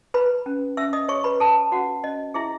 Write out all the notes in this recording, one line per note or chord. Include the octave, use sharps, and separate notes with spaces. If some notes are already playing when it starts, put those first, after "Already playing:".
B4 B5
C#4
C#4 E5 E6
D#5 D#6
G#4 C#5 C#6
B4 B5
A4 B4 A5
C#4 F#4 F#5
C#4 D#5
E4 G#4 E5